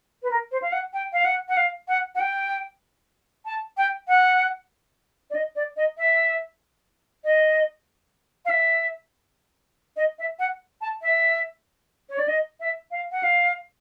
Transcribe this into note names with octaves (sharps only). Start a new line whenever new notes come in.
B4
A#4
C5
F5
F#5
G5
F5
F#5
F#5
F5
F#5
F#5
G5
A5
G5
F#5
D5
D#5
D5
D#5
E5
D#5
F5
E5
D#5
E5
F#5
A5
E5
C#5
D5
D#5
E5
F5
F#5
F5